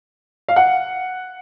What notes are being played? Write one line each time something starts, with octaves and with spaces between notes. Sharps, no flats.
F5
F#5